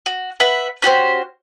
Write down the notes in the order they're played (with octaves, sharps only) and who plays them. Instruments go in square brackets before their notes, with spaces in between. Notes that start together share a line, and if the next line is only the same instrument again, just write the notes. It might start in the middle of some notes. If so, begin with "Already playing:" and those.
[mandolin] F#4
B4 E5 F#5
C#4 F#4 G4 C5